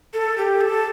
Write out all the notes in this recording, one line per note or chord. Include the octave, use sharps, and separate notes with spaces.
A4
G4
A4